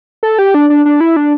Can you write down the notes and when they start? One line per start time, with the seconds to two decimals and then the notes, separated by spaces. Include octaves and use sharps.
0.23 A4
0.39 G4
0.54 D4
0.70 D4
0.85 D4
1.00 E4
1.16 D4